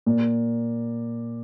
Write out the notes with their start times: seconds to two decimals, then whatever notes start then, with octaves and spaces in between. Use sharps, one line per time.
0.06 A#2